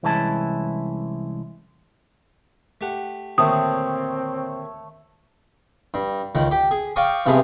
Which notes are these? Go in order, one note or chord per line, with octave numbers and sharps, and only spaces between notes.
C2 E3 G#3 C#4 E4 A5
A3 G4 F#5
D#2 A#2 D3 A3 C4 C#5 D#6
G2
C#2 D#3 F#5
G4
G#4
D5 F5 G5 A#5 C#6 D#6
G2 C3 B3 G#4 A5 A#5